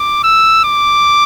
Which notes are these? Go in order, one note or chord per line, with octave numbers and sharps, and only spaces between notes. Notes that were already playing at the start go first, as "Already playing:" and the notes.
Already playing: D6
E6
D6